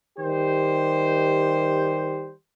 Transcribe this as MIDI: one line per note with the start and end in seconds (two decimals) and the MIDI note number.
0.19 2.32 51
0.19 2.32 55
0.19 2.32 67
0.19 2.32 72